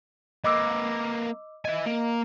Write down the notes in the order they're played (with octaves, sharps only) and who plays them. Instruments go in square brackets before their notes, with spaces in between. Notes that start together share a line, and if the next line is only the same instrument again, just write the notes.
[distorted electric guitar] A#3 B4 [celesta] D#5 D6 E6
[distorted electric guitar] E4 G#5 [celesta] D#5
[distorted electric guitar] A#3